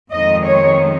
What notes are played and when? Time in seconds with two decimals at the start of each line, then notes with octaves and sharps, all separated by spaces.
0.13 F2 D#3 G#3 C4 D#4 D#5
0.46 C#5